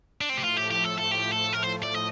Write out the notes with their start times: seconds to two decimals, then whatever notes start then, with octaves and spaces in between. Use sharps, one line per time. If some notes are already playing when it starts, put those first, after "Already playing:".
0.21 D4
0.29 A2 F3 A3 C4
0.37 G4
0.43 F4
0.57 G4
0.71 G4
0.84 A4
0.98 A4
1.11 G4
1.32 A4
1.53 A#4
1.63 C5
1.83 D5
1.94 D#5